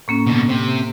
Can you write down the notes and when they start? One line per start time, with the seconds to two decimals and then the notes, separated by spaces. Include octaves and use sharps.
0.08 A2 A#3 C#4
0.27 B2 D3
0.49 C3